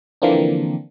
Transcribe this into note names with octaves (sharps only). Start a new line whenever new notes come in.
D3 E3 F3 A#3 C4 D4